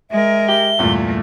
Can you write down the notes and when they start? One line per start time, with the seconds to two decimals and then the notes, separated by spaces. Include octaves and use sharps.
0.11 G#3 A#4 E5
0.48 G4 G7
0.79 E2 G2 A#2 A3